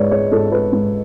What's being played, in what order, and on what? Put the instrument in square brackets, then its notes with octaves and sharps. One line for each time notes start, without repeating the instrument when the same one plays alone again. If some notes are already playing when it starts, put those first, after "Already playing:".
Already playing: [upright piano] G#2 G#3 B4 C#5 D5
G#3 C#5
G#2 A4
G#3 B4
G#2